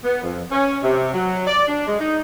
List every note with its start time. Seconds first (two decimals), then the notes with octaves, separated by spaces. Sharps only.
0.04 B3
0.23 F2
0.51 C#4
0.83 C3
1.13 F#3
1.47 D5
1.68 D4
1.87 G#3
2.00 D#4